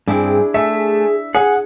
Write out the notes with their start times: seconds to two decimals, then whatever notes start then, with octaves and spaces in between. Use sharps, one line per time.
0.08 G2 C4 D4 E4 G#4
0.54 A3 E5
1.34 G#4 F#5